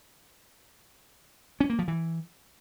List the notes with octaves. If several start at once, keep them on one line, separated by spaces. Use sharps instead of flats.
C#4
A#3
F3
E3